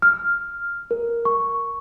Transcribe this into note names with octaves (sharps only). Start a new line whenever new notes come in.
F6
A#4
C#6